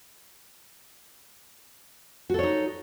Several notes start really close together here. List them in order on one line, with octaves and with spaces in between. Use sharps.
F#4 A4 C#5 D#4